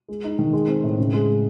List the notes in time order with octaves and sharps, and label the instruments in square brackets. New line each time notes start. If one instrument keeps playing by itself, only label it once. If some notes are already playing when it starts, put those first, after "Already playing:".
[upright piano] G#3
D#4
D#3
G#3
C4
A2
C#3
G#3